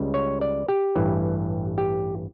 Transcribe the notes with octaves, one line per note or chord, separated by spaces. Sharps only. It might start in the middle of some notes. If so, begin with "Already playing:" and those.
Already playing: C#2 C#3 G3
C#5
D5
G4
A1 G2 E3
G4